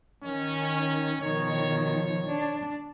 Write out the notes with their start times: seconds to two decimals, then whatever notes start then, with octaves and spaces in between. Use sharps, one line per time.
0.25 D#3 C#4
1.22 B2 D#3 F3 C#5
2.27 D4